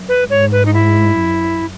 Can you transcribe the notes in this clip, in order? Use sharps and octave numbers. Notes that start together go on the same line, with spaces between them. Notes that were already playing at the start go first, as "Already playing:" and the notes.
Already playing: F#2
B4
G#2 C#5
B4
D#4
E4
F#2